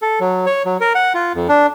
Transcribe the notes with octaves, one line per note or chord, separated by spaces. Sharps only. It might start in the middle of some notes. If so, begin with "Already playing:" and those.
A4
F#3
C#5
F#3
A#4
F#5
F4
F2
D4